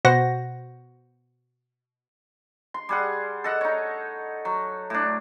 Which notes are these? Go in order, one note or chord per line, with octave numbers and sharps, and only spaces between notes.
B2 F#4 C5 F#5 A#6
C6
G3 G#4 F#5
A4 D#5 F#5
D#4 C#5
F#3
A2 D4